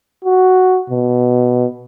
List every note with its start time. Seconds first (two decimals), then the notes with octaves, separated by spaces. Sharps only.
0.25 F#4
0.90 B2